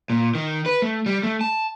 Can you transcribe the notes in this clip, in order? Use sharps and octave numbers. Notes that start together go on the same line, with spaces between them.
A#2
D#3
B4
A3
G3
A3
A5